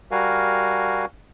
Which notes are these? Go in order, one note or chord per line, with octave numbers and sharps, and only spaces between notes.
G3 F#4 A#4 F5 G#5